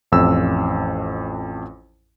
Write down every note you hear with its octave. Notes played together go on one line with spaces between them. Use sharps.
A1 F2 E6